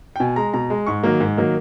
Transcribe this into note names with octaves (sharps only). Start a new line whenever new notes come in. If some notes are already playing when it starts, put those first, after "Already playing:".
G5
B2 G#5
G#3 A#5
B2 A#5
G#3
G#2 C#6
D#3 F#3 A#3
G#2
D#3 F#3 A#3